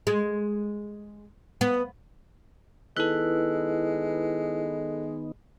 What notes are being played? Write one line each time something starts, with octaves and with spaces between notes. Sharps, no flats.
G#3
B3
D#3 G#3 B3 D#4 E4 A4 B4 F#6